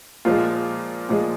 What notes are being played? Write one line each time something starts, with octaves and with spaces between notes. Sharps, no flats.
A#2 F3 G#3 F4
A#2 F3 G#3